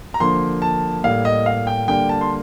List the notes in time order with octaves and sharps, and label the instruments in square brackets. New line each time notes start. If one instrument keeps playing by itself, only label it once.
[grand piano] A#5
D3 F3 A#3 C6
A5
A2 G3 A#3 F5
D#5
F5
G5
D3 G3 A#3 G5
A5
C6